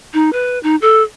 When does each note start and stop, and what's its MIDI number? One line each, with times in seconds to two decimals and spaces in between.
0.14 0.30 63
0.33 0.59 71
0.63 0.76 63
0.81 1.03 69